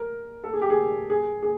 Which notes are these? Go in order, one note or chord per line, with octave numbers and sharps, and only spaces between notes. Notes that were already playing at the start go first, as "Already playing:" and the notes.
Already playing: A#4
A4
G#4
G4
G#4
G#4
G#4